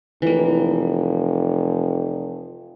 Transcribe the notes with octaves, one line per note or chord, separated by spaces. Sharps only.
F1 E3 A#3